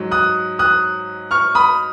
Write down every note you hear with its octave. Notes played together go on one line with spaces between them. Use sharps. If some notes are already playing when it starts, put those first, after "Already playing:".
Already playing: G#2 F#3
D#6 F#6
D#6 F#6
C#6 F6
B5 D#6